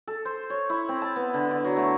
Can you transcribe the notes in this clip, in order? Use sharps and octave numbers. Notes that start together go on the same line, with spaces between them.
A4
C5
C#5
E4
C4
A5
B3
D3
D5
F#3
A3